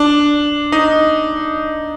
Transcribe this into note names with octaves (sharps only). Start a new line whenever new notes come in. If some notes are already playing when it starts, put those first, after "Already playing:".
Already playing: D4
D#4